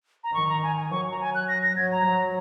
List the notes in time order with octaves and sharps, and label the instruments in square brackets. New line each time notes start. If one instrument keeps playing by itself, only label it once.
[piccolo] A#5
[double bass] D#3 [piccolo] C#6
[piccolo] A#5
G#5
G#5
[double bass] F#3 [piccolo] C#6
[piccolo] A#5
G#5
F#6
A#6
A#6
[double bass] F#3 [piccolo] G#6
[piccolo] A#5
[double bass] F#3